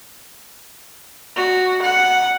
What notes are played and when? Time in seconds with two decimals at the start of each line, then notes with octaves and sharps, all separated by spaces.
1.36 F#4
1.82 F#5